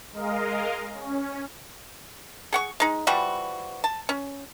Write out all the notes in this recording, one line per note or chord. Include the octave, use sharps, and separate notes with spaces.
G#3 A#4 D#5 F5
C#4
G#4 F#5 C#6
G#3 D#4
E3 F3 G3 F#4
A5
C#4